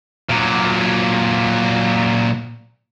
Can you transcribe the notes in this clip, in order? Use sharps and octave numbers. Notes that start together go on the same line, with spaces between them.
A#2 F#3